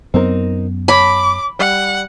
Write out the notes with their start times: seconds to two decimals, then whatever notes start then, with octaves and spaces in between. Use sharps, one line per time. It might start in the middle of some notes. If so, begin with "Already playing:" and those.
0.14 F#2 F#3 B3 C4 D#4 A#4
0.88 C#5 A5 B5 D6
1.59 G3 F#5